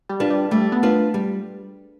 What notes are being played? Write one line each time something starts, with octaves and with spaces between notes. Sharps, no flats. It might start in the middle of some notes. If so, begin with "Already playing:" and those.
G3
D4 F4 B4
G3
G3 A3
B3
D4 F4 B4
G3